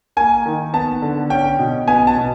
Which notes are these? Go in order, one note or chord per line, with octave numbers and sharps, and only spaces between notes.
A#3 G#5
D#3
B3 A5
D3
C#4 G5
B2
B3 G#5
A5
B2